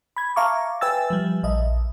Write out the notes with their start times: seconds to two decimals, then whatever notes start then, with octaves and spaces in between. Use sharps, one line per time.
0.16 B5 G#6
0.36 E5 F5 A5 A#5 C#6 D6
0.81 B4 E5 G5 G#5 E6 A6
1.10 F3 G3
1.43 A#1 D#5 E5